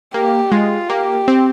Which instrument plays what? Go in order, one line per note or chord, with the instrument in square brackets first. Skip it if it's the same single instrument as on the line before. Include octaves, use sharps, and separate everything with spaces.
[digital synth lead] A#3 [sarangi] G4
[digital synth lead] G#3 [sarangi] F4
[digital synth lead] A#3 [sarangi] G4
[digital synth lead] C4